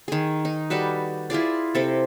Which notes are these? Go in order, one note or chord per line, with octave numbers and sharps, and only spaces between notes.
D#3 G#4
D#4
G3 F#4 A4 B4
E4 F4 G#4 D5
C3 A4